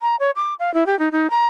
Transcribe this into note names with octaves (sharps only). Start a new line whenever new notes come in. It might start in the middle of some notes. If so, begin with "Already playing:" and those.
A#5
C#5
D6
F5
E4
G4
D#4
D#4
A#5